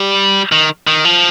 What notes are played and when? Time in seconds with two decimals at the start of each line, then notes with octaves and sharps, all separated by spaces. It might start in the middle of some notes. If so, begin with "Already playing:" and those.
Already playing: G3
0.52 D#3
0.87 D#3
1.05 F3